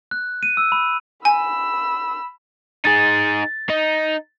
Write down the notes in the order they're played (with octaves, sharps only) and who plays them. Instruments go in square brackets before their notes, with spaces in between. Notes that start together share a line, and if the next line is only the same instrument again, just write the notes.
[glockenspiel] F#6
D#7
E6
B5
[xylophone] G#5 [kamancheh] B5 E6
[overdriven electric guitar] D#4 G#4 [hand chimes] A6
[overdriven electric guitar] D#4